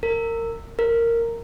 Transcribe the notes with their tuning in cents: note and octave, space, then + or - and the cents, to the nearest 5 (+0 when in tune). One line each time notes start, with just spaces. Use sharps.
A#4 -25
A#4 -10